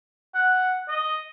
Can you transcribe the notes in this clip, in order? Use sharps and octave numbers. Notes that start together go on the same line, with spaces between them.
F#5
D#5